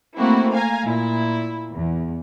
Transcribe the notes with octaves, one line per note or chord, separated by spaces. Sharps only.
A3 A#3 C4 E4 F#4
F5 G#5 A#5
A#2 E4
E2